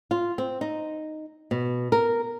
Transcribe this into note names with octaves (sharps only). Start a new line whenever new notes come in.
F4
C4
D#4
B2
A#4